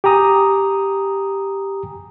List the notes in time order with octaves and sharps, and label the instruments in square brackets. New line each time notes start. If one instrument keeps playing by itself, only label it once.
[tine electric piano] G4 G#5 A#5 D#6